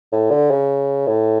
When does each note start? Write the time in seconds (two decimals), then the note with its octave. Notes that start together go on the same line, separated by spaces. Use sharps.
0.13 A2
0.31 D3
0.51 C#3
1.07 A2